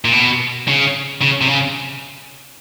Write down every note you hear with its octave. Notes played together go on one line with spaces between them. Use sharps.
A#2
B2
C#3
C#3
C3
C#3